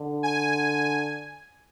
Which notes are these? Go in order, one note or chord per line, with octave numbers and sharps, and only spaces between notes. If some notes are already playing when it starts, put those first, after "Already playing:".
Already playing: D3
G#5